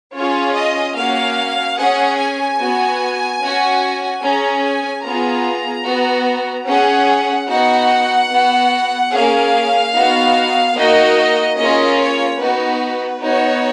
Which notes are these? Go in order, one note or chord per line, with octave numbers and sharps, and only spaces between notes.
C#4 F4 G#4 C#5
D#5
A#3 C#4 F#4 F5
C#4 G#4 F#5
G#5
B3 F#4
C#4 F#4
C#4 G#4 A#5
G#5
B3 F4 G#4 A#5
B3 F#4
C#4 G#4 F#5
B3 D#4 F#4 F#5
B3 F#4
A#3 C#4 G#4 F5
B3 D#4 F#4
A#3 D#4 F#4 D#5
A#3 C#4 F4 G#4 D#5
C#5
B3 D#4 F#4 B4
B3 D#4 F#4 C#5